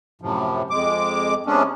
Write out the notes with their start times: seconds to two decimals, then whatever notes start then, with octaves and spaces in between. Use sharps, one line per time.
0.21 F#2 A2 C3 F3
0.70 F2 G#3 D6
1.46 C3 G#3 B3 C#4 D4